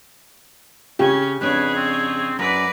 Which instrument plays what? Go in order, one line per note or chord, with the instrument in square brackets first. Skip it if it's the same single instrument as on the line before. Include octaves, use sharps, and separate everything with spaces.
[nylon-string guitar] C#3 [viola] C#4 [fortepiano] G4
[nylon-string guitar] F2 C#3 D4 [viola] G#4 C#5 [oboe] B4
[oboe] C4
[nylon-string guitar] F#2 [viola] B4 D5 [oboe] A#5